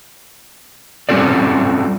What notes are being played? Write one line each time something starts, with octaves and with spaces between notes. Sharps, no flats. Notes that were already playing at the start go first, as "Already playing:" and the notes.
G3 C4 C#4 F4 A4 D5